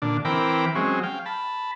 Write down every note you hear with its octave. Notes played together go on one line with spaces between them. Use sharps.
A#2 D3 D4
E3 C4 A#4 G5 B5 D6
F#3 G#3 C4 C#4
F5 G5
A5 B5